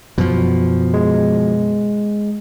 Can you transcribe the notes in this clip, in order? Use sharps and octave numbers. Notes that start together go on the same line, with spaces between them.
F#2 B2 F3
G#3